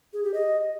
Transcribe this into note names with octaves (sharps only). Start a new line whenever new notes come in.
G#4
G4
D#5